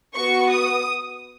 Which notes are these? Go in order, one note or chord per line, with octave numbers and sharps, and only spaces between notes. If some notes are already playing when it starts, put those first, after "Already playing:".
B3 F#4 C#6
D#6